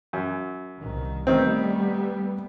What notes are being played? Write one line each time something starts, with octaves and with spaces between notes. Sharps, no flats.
F#2
C2 D#3
D#3 G3 A3 B3 C4